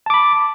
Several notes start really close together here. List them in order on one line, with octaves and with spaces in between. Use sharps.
A5 D6 B5